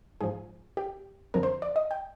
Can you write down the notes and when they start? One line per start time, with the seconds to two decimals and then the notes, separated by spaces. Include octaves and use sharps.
0.21 G#2 F3 G#4
0.77 G4
1.34 F2 D3 F3 A#4
1.43 C5
1.62 D5
1.76 D#5
1.91 G5